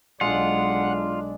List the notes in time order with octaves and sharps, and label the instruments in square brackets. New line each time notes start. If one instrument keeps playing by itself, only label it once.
[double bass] B1 D4 [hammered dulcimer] G#3 [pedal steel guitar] F4 [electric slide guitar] F#5